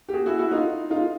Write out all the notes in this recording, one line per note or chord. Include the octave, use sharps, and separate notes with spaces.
G4
F#4 G#4
E4 F#4
E4 F#4
D#4 F4
D#4 F4